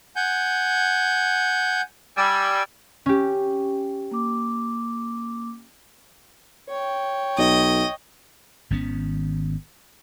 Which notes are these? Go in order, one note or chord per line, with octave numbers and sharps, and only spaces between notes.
F#5 G#5 G6
G3 G#5 E6
C#4 G4
A#3 D6
C#5 G5
B1 D#5
G#1 D#3 B3 C#4